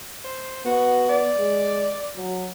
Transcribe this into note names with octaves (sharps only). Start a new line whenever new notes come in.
C5
B3 F#4
D5
G#3
F#3